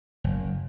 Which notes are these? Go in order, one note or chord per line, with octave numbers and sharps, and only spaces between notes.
F#1